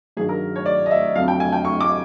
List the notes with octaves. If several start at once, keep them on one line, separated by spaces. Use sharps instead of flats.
G2 D#3 F#3 G#4
A#4
C#5
D5
D#5
E5
F2 D3 F#3 F5
G5
G#5
G5
C#6
D6